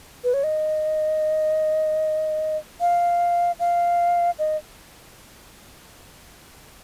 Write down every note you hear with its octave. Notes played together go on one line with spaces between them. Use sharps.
B4
C#5
D#5
F5
F5
D#5